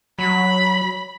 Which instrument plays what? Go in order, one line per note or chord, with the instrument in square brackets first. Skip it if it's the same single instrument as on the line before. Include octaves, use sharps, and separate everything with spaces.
[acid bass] F#3 [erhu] B5